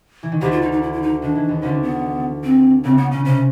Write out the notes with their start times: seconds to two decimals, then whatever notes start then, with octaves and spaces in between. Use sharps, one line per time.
0.23 E3
0.32 D#3
0.41 D2 D3 G4
0.52 F4
0.62 D#4
0.72 D#4
0.82 E4
0.93 E4
1.02 D#4
1.22 D#3 D4
1.35 E3
1.49 D#2 D#3
1.63 D2 D3 C#4
1.83 B3
2.44 C4
2.84 C#2 C#3 C4
2.97 B3
3.11 C#3 C#4
3.25 C3 C#4